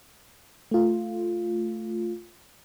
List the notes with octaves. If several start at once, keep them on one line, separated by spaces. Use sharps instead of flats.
A3 F4